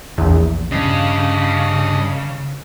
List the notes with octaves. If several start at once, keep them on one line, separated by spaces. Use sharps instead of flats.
A#1 E2
G2 C#3 D#5